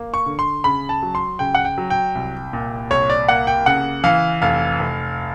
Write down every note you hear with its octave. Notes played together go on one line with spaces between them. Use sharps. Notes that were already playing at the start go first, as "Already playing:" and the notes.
Already playing: A#3
C#6
D3
C6
C#3 B5
A5
F#3
C6
C#3 G5
F#5
G5
F#3
G5
C2
A#2
C2 C#5
D5
A#3 F#5
G5
C#3 F#5
E3 F5
F1 F5
F1